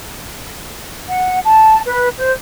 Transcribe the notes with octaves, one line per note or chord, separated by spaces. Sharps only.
F#5
A5
B4
C5